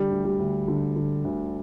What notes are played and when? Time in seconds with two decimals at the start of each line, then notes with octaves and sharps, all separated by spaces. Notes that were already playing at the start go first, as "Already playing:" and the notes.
Already playing: D3 G3
0.11 D2
0.25 G3
0.39 D2
0.68 D3
0.96 D3
1.24 D2